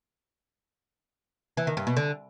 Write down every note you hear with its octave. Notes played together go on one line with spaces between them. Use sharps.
E3
D#3
G2
B2
D3